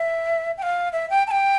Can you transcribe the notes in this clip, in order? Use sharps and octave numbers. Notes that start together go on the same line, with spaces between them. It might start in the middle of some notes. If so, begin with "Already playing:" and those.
Already playing: E5
G5
F5
E5
G5
A5
G5